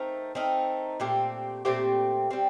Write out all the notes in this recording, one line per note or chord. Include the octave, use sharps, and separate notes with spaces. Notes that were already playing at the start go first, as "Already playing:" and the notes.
Already playing: A3 C4 D#4 A#4
A3 C4 D#4 A#4
A#2 A3 C4 G4
A#2 A3 C4 G4
G3 C4